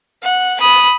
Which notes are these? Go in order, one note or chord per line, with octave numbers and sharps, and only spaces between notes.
F#5
B5 D#6